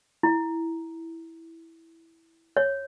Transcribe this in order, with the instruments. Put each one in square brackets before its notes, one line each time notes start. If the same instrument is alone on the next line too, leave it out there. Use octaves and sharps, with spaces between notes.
[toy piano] E4
C#5